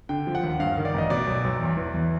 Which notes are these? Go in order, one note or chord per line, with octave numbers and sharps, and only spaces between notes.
D3 G5
F3
F#5
D#2
G2 F5
D#3
D5
A1 D#5
B2 D5
B1
B1
E2
E3
E2